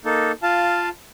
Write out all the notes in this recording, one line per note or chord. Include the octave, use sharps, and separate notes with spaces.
A#3 D#4 A4
F4 F5 A5